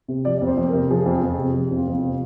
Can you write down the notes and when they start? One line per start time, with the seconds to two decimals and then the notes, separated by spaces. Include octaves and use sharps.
0.08 C3
0.25 F3 D5
0.38 F2 D5
0.47 C5
0.58 F2
0.69 C3 A#4
0.90 F3 G#4
1.06 F2
1.23 F2
1.38 C3
1.55 F3
1.71 F2
1.76 F4
1.87 F2
1.98 C3 F4